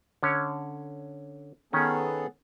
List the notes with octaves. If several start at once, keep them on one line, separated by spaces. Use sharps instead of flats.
D3 C#4 C#5
D#3 B3 C#4 G#4 A4